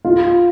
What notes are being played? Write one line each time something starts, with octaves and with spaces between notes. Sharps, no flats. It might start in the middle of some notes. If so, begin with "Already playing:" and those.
F4